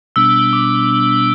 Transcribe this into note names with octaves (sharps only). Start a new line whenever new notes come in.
B2 G3 B3 D4 E6
D6